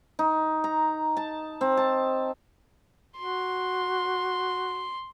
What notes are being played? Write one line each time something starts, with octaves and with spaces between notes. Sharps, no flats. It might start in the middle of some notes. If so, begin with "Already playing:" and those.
D#4
A#5
A5
C4
A5
F#4 C6